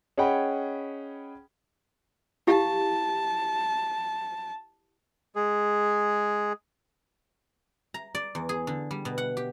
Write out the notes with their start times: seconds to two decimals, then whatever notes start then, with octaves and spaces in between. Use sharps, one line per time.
0.18 C#4 G#4 D#5 F#5 G5 B5
2.47 E4 G4 F5 A5
5.36 G#3 G#4
7.94 A#5
8.15 D5
8.35 E2
8.49 G#4
8.67 D3
8.91 G3
9.05 B2
9.18 F#5
9.37 G4